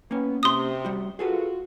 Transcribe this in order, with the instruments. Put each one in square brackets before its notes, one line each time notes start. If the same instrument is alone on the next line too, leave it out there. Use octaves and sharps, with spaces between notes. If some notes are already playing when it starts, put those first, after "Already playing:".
[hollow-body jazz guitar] A#3 C#4 [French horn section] B3
[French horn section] C3 [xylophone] C6 D#6
[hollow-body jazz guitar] G3 F#4
[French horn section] F4 F#4 [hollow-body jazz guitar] G#4 A4 B4